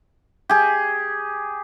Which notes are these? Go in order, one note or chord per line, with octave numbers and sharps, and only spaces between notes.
G4 G#4